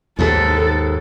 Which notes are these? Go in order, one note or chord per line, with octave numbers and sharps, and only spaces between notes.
D#2 G#2 A4